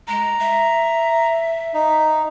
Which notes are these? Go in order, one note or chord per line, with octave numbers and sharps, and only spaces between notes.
G#3 A#5
E5
D#4